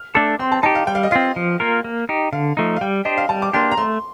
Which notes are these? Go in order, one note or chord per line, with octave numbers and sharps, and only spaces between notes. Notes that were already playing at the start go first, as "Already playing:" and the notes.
Already playing: F6
A3 D4 A4 D6
C4 C6
A5
D#4 G4 A5
F5
G3 G5
F5
D#5
C4 F4 F5
F3
A#3 F4 A#4
A#3
D#4 G4
D3 F5
F3 A3 D#4
F5
G3 G5
D4 G4 C5 D#5
F5
G3 A5
D6
A#3 D4 G4 C6
A#5
A3 C6